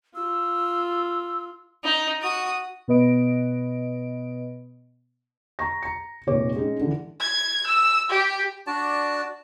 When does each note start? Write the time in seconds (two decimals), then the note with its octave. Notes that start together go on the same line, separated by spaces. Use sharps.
0.16 F4 E6
1.84 D#4
2.22 F#4 D#6
2.88 B2 B3 B4 D#5 D7
5.59 A#5 C#6 A#6
5.83 A#5 C#7
6.27 F1 A#2 D#4 G4 C#5 D6
6.56 G#3 C#4 D#4 G4
6.81 D3 E3
7.20 G#6
7.67 E6
8.10 G4
8.67 D4 F#4 D5 A5